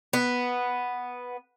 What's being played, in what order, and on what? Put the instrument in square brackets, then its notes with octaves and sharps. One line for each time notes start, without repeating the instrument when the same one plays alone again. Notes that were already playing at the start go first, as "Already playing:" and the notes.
[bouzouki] B3